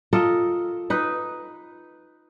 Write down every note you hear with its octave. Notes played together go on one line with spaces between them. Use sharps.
F4 A4 A#4 D#5
D#4 B4